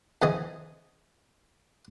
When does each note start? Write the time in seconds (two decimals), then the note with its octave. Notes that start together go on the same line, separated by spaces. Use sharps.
0.22 F2 C#3 E3 G#4 D#5 G#5